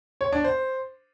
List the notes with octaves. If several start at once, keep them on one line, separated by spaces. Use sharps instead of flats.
C#5
D4
C5